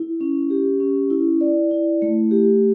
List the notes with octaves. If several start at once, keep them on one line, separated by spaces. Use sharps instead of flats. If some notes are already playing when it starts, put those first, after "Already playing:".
Already playing: E4
C#4
G4
C#4
E4
D5
E4
A3
G4